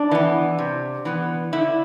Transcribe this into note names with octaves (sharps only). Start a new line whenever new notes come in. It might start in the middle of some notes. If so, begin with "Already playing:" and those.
Already playing: D4
E3 B3
C3
E3 B3
D3 E4